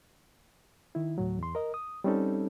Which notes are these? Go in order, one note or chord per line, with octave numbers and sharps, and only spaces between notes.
D#3 E4
D2 A2 F#3
E2 C6
A#4 D#5
D#6
G3 C4 C#4 D#4 A4